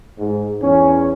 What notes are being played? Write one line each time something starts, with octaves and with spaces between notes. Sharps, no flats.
G#2
E2 C#4